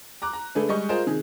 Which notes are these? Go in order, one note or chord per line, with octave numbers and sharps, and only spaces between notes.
A#5 D6 F#6
A#5
D3 A3 D4 G#4 B4
G3 G#3 D#5 C#6
F4 G#4 A#4 C5 D#5
C3 D#3 G#4